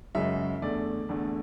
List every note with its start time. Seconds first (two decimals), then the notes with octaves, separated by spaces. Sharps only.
0.15 F#2 C#3 G#3 E5
0.62 E2 D3 A3 D5
1.09 E2 D3 A3